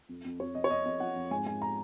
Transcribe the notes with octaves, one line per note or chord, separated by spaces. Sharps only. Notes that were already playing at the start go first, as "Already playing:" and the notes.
F2
F2
F2 C#5
F2 D#5
C#5
F2 D#5
F2 D#5
F3 F#5
F2
G#2 G#5
G#2 G#5
A#5